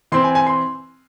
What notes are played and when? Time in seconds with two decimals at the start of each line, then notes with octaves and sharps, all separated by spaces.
0.12 E3 C4 C6
0.24 G#5
0.35 G#5
0.46 C6